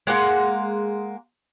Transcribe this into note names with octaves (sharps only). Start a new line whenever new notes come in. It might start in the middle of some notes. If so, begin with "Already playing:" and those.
G#3 A#3 F#5